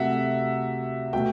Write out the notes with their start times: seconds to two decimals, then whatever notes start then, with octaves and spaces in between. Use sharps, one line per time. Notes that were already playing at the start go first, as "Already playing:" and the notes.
Already playing: C3 F#3 A3 E5 F#5
1.13 B2 A3 G5